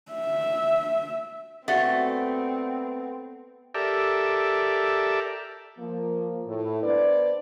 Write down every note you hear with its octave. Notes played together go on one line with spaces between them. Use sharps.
E5
A3 B3 C4 F#4 D5 F#5
G4 A4 A#4 D5 E5
F3 A#3
A2
B3 D4 B4 C5 D5